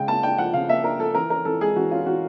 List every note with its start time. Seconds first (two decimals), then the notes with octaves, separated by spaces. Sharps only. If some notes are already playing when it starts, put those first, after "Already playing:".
Already playing: C#3 G#3 G5
0.08 A#3 A5
0.23 D4 G5
0.38 F3 F#5
0.54 C#3 F5
0.69 A#3 E5
0.84 D4 A#4
0.99 F3 A4
1.15 E3 A#4
1.30 C#4 A#4
1.45 E3 A4
1.61 G#3 G#4
1.76 E3 F#4
1.91 C#4 F4
2.06 E3 F#4